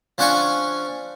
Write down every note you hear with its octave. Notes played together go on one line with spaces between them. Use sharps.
F3 C#4 D4 F#5 G#5 C#6